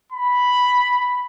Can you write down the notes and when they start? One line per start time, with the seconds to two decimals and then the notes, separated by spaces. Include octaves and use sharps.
0.12 B5